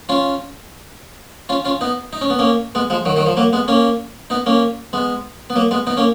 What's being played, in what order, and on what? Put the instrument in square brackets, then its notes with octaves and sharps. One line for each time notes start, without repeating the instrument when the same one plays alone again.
[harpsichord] C#4 F4
C#4 F4
C#4 F4
B3 D#4
D#4
C#4
B3
A#3 C#4
G#3 B3
F3 G#3
D#3 F#3
D#3 F#3
F3
F#3 A#3
G#3 B3
A#3 C#4
B3 D#4
A#3 C#4
G#3 B3
B3
F#3 A#3
G#3 B3
B3 D#4
A#3 C#4